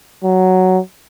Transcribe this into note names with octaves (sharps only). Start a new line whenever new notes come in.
F#3